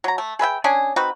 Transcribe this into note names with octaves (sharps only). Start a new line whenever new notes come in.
F#3 A#5
A3
G#4 B4 E5 G5
C#4 D4 G#4 G#5
C4 D#4 F#4 B4